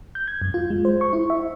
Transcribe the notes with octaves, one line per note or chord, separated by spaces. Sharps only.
G6
G#6
F#2
F4
G#3
C5
C#6
E4
E5